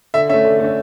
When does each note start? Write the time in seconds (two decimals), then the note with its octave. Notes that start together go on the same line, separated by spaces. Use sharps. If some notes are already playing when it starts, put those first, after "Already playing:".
0.14 D3 E5
0.29 A3 C#4 E5
0.45 D3
0.60 A3 C#4